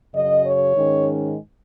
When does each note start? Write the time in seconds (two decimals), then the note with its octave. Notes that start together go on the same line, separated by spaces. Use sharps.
0.14 F#2 C#3 F#3 D#5
0.46 C#5
0.76 G#2 D#3 G#3 C#4